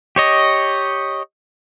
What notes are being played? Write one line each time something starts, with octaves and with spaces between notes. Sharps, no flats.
G4 C#5 D#5